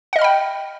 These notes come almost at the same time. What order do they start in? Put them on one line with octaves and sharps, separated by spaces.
F#5 D#5 F6 B5 G5